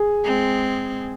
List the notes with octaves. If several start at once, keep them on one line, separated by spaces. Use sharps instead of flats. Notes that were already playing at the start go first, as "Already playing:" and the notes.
Already playing: G#4
G#3 C4